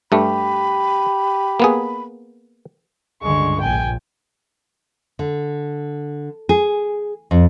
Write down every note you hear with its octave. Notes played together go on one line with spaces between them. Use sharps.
G2 A3 G4 B5
A#3 B3 G#4
C#2 G2 D3 G#3 C#6
A#1 A#2 G5 G#5
D3
G#4
F2